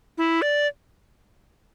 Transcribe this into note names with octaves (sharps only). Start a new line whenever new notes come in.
E4
D5